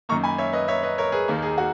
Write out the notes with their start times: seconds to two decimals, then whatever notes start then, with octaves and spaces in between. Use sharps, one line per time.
0.09 F#2 D#3 A#3 A#5 C#6
0.24 G#5 B5
0.38 C#5 E5
0.53 B4 D#5
0.68 C#5 E5
0.83 B4 D#5
0.98 A#4 C#5
1.12 G#4 B4
1.28 D#2 D#3 A#3
1.42 G#4
1.58 F#4